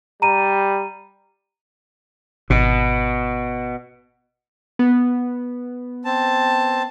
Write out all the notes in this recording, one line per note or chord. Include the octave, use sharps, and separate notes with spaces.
G3 A#5 D#7
G#1 B2
B3
C4 A5